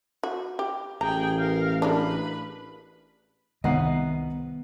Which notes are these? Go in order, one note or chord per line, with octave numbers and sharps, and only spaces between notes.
F#4
G4
A1 G#4 G5 A#5
A#4 F5
G#3 A#3 D4 B4 B5
C2 D#3 B3 D#5 F#5 A#5 C7